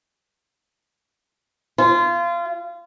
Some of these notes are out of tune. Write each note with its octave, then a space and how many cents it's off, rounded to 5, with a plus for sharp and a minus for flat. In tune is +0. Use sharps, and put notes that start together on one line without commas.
F4 -25